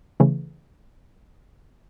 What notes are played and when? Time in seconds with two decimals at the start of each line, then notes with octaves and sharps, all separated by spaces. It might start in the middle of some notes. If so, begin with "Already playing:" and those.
0.20 C#3 E3 A3